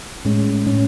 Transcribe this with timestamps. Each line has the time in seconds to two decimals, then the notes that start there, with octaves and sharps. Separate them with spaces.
0.25 A2 G#3 C#4
0.66 A2 G#3 C#4